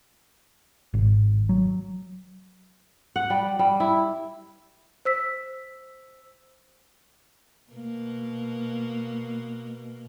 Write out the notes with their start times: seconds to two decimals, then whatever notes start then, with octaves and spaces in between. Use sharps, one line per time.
0.94 G#1
1.49 F#3
3.16 F#5
3.30 G3
3.59 G3
3.80 E4
5.05 C5 E6 B6
7.72 B2 A#3